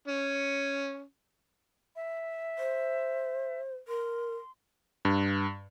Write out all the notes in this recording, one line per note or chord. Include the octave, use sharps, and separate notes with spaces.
C#4
E5
C5
A#4 C6
G2